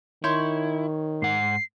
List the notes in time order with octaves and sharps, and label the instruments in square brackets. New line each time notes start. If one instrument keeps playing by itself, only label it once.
[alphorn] D#3 [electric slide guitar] E4 [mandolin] C#5 C6 G6
[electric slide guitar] G#2 F#5 [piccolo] C7